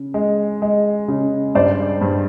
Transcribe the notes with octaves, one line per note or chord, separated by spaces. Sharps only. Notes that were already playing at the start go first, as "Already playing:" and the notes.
Already playing: C#3
G#3
G#3
C#3
G2 C5 D5
G2